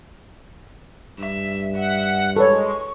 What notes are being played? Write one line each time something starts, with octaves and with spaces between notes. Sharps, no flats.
G2 E5
E5 F#5
G#3 A4 B4 C#5 C#6